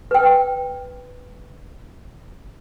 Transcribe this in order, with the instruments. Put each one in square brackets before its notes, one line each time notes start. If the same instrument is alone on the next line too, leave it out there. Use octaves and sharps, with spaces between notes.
[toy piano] B4 G5